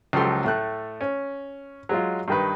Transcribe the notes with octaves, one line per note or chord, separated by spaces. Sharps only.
C#2 F3 F#3 G4 A4 C6
A2 A3 F#6
C#4
F#3 G#3 F4
G2 D#3 B4